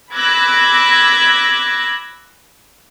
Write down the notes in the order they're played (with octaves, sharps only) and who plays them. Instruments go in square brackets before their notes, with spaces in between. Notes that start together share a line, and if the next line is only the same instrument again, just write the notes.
[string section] B5 D6 E6 F#6 G#6 A#6